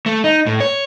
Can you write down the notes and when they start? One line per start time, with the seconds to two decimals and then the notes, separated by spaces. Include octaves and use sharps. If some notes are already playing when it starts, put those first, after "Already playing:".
0.06 A3
0.24 D#4
0.47 A2
0.60 C#5